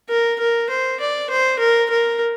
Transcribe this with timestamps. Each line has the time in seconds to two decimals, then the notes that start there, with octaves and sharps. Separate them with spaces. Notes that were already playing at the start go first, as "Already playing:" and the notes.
0.10 A#4
0.40 A#4
0.70 C5
1.00 D5
1.30 C5
1.59 A#4
1.90 A#4